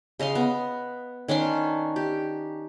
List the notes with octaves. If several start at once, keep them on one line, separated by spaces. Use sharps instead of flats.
C#3 D#5 F5 C6
B3
D#3 C#4 D4 C6
G4